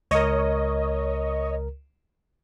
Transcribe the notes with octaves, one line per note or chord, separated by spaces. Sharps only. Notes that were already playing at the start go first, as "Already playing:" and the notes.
C#2 A#4 C#5 D#5